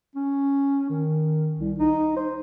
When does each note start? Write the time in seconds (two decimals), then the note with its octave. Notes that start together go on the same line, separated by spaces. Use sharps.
0.16 C#4
0.90 D#3
1.58 C2
1.78 D#4
2.16 C5